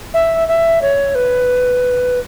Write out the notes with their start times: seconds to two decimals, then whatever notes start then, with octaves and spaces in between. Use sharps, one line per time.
0.14 E5
0.48 E5
0.82 C#5
1.15 B4